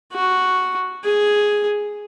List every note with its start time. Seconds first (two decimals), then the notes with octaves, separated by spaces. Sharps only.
0.13 F#4
1.04 G#4